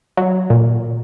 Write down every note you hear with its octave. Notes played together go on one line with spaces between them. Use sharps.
F#3
A#2